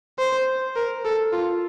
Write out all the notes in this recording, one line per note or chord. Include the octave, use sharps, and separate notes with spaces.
C5
A#4
A4
F4